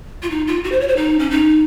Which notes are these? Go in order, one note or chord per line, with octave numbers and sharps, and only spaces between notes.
F4
D#4
F4
F#4
C5
C#5
C5
D#4
C#4
D#4